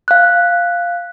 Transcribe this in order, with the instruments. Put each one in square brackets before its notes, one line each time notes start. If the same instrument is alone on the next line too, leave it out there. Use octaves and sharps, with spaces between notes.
[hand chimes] F5 F#6